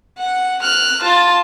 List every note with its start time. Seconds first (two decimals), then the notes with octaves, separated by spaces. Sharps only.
0.18 F#5
0.62 F6 F#6
1.01 F4 A5